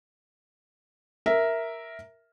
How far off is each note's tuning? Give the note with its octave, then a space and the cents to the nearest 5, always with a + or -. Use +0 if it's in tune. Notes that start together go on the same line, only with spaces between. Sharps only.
A#4 +0 E5 -5